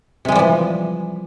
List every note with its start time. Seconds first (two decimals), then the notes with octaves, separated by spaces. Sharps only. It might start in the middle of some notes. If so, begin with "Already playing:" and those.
0.25 C3
0.28 G#3
0.32 G3
0.35 F3
0.39 E3